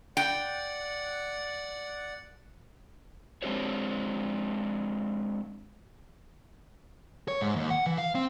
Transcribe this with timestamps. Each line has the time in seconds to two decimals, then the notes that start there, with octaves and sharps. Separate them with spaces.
0.17 D5 F#5 G5
3.42 G#3 C4 D4 G4 C5 C#5
7.28 C#5
7.41 G#2
7.56 D#2
7.70 F#5
7.86 E3
7.98 F5
8.15 C4